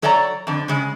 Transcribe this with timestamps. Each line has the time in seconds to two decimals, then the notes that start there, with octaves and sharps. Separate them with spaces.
0.02 F#3 A4 C#5 D5 F#5 A#5
0.47 F2 D3
0.68 C#3 G#3